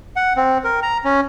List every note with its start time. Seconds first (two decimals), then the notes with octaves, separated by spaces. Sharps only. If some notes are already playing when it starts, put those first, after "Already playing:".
0.16 F#5
0.36 C4
0.64 A#4
0.83 A#5
1.05 C#4